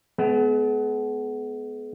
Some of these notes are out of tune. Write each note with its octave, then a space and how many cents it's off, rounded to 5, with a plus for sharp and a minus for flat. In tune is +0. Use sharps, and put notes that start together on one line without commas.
G#3 +45 B3 +15